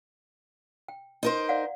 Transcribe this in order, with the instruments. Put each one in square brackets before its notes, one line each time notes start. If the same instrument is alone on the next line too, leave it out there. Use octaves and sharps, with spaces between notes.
[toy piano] G5
[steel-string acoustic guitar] D#4 A#4 C5
[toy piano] D5 F5 F#5